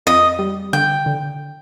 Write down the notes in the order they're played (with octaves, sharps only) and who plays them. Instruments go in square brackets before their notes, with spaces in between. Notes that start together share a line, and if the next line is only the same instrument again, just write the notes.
[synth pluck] F2 [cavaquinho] D#5
[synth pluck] G3
[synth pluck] D3 [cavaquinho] G5
[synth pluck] D3